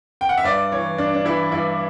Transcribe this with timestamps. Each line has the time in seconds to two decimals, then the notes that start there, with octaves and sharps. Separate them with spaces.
0.21 G5
0.29 F#5
0.38 E5
0.44 G2 D5
0.72 E3 C#5
0.98 G2 D4
1.14 D4
1.25 E3 E4
1.51 G2 E4